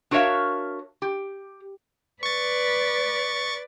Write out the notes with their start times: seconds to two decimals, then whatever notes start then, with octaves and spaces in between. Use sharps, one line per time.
0.11 D4 F#4 A#4 C#5 E5 F5
1.02 G4
2.23 B4 D5 C#6 A6